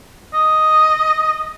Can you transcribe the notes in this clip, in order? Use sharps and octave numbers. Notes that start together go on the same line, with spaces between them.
D#5